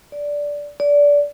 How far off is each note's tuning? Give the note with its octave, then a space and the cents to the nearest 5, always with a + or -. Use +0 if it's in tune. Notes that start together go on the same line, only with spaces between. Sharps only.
D5 -10
D5 -20